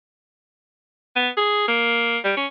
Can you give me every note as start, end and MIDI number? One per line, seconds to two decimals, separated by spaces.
1.16 1.29 59
1.37 1.63 68
1.68 2.18 58
2.24 2.32 55
2.37 2.46 61